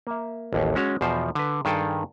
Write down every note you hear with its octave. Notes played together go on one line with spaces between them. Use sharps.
A#3 E5
A1 D#2
G#3 C#4 F#4 C#5
E2 B2 F3 C5
D3 B4
G2 D#3 G#4 A4 G5